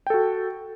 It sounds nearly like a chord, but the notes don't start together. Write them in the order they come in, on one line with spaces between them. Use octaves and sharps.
G5 A4 F#4